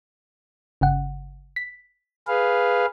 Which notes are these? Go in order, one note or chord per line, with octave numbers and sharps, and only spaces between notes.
G1 C#3 F#5
B6
G#4 B4 F5